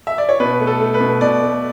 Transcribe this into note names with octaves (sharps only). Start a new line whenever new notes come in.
E5
D5
C#5
B2 B4
A3
A4
A3
B4
B2
B2 D5
A3